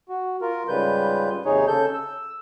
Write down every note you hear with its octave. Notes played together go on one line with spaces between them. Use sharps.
F#4
F4 A#4
G#2 C#3 G3 F4 B4 G6
D#2 C3 D#4 G#4 C#5
C#3 A4 G6
E6